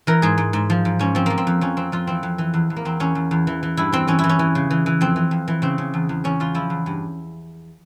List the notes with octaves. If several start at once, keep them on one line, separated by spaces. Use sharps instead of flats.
E3 A#4
G#2 G#4
G#2
G#2
F3
G#2
G#2 C#4
F3 C4
F3 A#3
C4
F2
F2 C#4
F2 C4
F2 F4
E3 C4
F2
E3
E2
E2
A#3
E2 C4
E2 C#4
E2
E2
E3
E3
G2 E4
E3 C4
E3 C#4
E3 E4
C#4
E3
C#3
E3
E3
F2 C4
E3
F2
E3
C#3 C4
C#3
E2
E2
E2 C#4
E2 F4
F3 E4
E2
G2